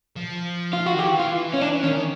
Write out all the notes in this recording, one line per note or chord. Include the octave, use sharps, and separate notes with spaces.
F3
F4
F#4
D#3
E3 G4
F4
C#4
D4
D#3 C#4